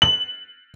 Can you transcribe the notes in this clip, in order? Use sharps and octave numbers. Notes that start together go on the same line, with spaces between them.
F#7